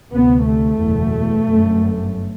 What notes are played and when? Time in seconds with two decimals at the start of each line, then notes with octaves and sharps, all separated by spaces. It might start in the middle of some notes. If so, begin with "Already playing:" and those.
0.11 D2 C3 B3
0.44 A3
0.78 F#1 E2 B2
1.44 G1 F#2